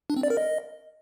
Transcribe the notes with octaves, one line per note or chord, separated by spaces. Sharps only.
D4
C4
D5
A#4
D#5